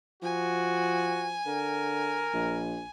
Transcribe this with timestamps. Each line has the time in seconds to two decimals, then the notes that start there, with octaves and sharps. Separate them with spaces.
0.23 F3 F#4 G#5
1.46 D3 A#4
2.34 A#1